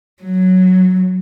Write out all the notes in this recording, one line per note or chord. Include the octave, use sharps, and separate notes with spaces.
F#3